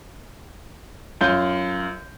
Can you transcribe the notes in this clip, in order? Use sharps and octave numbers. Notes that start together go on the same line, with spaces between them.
F#2 F4 G6